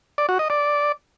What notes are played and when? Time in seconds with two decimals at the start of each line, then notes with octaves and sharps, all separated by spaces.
0.18 D5
0.29 F#4
0.39 D#5
0.50 D5